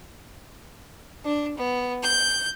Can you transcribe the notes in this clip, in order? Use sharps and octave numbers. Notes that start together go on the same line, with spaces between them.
D4
B3
G6